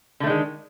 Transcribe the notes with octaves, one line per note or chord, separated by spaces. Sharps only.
D3 D#3 G#3 A3